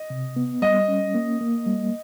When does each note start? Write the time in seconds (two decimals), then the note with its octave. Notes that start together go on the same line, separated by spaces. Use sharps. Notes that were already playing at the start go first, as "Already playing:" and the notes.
Already playing: D#5
0.10 C3
0.36 B3
0.62 G3 D#5
0.88 C#4
1.15 A#3
1.41 A#3
1.66 G3